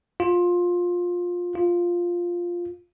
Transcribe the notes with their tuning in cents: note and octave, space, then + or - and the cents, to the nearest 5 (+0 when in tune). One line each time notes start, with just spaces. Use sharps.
F4 +15
F4 +0